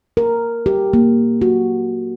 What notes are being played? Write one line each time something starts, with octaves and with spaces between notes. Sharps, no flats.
A#4
G4
A#3
F#4